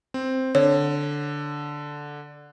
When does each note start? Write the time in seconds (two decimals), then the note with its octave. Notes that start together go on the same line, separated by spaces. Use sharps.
0.14 C4
0.55 D3 C#5